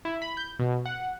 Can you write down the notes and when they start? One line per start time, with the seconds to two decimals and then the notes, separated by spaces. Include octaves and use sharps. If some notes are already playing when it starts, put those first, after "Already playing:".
0.05 E4
0.22 B5
0.37 G6
0.59 B2
0.86 F#5